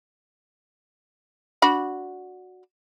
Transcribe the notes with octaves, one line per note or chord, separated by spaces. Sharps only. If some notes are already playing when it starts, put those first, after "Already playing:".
D4 F#4 B5